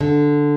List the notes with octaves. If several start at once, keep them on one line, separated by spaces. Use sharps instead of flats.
D3